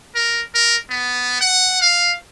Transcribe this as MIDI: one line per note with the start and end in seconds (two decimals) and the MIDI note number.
0.15 0.42 70
0.55 0.77 70
0.90 1.40 59
1.41 1.78 78
1.82 2.13 77